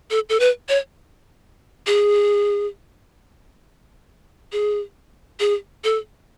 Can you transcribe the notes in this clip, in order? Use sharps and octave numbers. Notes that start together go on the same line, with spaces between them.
A4
A4
B4
C#5
G#4
G#4
G#4
A4